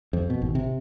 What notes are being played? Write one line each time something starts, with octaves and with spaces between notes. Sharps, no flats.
F2
B2
G#1
C3